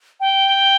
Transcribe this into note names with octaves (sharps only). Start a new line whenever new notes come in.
G5